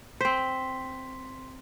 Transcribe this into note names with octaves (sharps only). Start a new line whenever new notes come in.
C4 C5 C6 B6